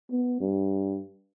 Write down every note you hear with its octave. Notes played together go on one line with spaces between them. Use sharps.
B3
G2